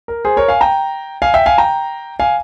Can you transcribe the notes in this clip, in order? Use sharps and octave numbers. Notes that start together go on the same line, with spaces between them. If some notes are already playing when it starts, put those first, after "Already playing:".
A#4
G#4 C5
A#4 C#5
F5 G#5
G5 A#5
F5 G#5
E5 G5
F5 G#5
G5 A#5
F5 G#5